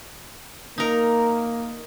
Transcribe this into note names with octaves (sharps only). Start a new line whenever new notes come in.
A#3 D#4 A#4